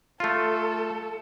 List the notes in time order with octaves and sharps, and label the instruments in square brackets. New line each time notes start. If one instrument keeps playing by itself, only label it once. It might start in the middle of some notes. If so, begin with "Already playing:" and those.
[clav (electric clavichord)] A3 F4 [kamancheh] A4